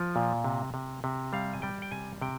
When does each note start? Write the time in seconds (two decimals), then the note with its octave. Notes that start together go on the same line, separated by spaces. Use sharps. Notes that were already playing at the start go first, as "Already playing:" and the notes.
Already playing: F3
0.16 A#2
0.44 C3
0.74 C3
1.04 C3
1.33 G3 F5
1.53 G#5
1.62 G3 G5
1.82 G5
1.91 C3 G#5
2.21 C3 G5